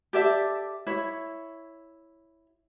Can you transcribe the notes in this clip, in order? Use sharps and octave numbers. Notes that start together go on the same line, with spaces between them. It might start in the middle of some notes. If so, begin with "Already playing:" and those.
G4 A4 D5 E5
E4 C#5